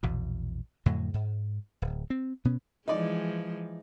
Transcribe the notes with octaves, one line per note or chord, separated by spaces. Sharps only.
A#1 E2 B2
F2 A2 D3 F#3
G#2
D1
C4
B2 B3 C#4
E3 F3 G#3 D#4 D5